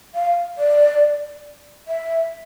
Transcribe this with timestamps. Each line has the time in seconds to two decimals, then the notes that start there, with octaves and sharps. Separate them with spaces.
0.15 F5
0.58 D5
1.88 E5